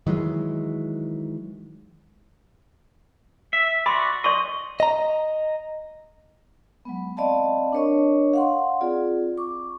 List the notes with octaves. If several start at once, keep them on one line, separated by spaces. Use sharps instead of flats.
D#3 E3 F#3 G#3
E5
F#4 D5 B5 C6
D5 D#5 C6 C#6
D#5 A#5
F#3 G#3 B3
C4 D5 D#5 F5 A5 B5
D4 A#4 C#5 D#5 C#6
F5 F#5 C6
C4 F4 G#4 D5
C#6 D6